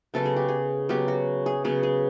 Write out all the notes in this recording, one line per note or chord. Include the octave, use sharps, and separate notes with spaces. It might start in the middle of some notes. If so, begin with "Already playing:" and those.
C#3 F#3 B3 A4
G#4
G4
G#4
C#3 F#3 B3 G4
F#4
G#4
C#3 F#3 B3 G#4
G#4